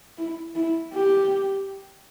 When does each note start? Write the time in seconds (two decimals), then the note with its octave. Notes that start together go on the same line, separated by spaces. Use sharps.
0.17 E4
0.55 E4
0.93 G4